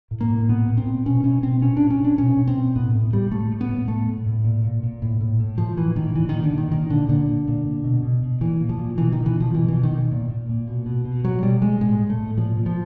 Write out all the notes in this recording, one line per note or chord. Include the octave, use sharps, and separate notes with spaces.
A2
A#3
A2
A#2 B3
A#2
C4
A#2
B2 C#4
B2 C#4
B2 C4
A#2 C#4
A#2 D4
C#4
A#2 D4
B2 C#4
B2
C4
B2
A2 B3
A2
A2 G3
A2 A3
A2
B3
A2
A2 A3
A2
A2
A#2
A#2
A#2
A2
A2
A2
A2 F3
A2 E3
A2 D#3
A#2 E3
A#2 D#3
D3
A#2
D#3
A#2 D#3
A#2 D3
A#2 D3
A#2
A#2
A#2
B2
B2
B2
A#2 E3
A#2
F3
A#2
B2 E3
B2 D#3
E3
B2 F3
B2 E3
B2 E3
D#3
B2
A#2
A#2
A#2
B2
B2
B2
B2 F#3
B2 G3
B2 G#3
A2 G#3
A2
A3
A2
A#2 F3
A#2
F3